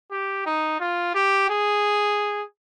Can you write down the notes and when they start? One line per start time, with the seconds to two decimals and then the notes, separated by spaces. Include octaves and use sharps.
0.11 G4
0.46 D#4
0.80 F4
1.14 G4
1.50 G#4